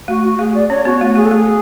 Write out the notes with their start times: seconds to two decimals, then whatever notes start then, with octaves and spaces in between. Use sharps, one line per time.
0.08 A3 F#4
0.24 F#4
0.39 A3 G#4
0.55 D5
0.70 C#4 C#5
0.85 B3 F#4
1.01 A3 F#4
1.16 A3 G#4
1.25 A4
1.31 A3 G#4